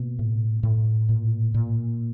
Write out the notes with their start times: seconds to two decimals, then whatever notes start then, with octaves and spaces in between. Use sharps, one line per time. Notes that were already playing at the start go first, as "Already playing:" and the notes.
Already playing: B2 A#3
0.19 A2
0.63 A2
1.09 A#2
1.54 A#2